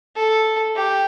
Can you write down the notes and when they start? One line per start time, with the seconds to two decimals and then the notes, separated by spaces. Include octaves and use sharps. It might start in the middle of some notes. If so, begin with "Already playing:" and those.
0.17 A4
0.76 G4